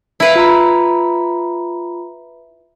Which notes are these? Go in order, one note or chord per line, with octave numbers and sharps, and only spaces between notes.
E4 B4 F5
F4 A#5 B5